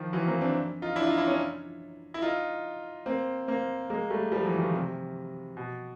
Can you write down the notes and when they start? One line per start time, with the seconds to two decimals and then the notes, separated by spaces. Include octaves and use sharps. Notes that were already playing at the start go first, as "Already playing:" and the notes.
Already playing: D#3 F3
0.13 E3 F#3
0.27 A#3 C4
0.41 C4 D4
0.82 D#4 F4
0.96 D4 E4
1.07 D#4 F4
1.18 D4 E4
1.28 C#4 D#4
2.14 E4
2.22 D#4 F4
3.06 A#3 C4
3.48 A#3 C4
3.90 G#3 A#3
4.10 G3 A3
4.32 F3 G3
4.45 E3 F#3
4.59 D#3 F3
4.74 C3
5.57 B2